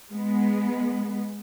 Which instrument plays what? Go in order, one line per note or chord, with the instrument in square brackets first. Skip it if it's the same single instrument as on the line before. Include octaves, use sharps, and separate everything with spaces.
[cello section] G#3 B3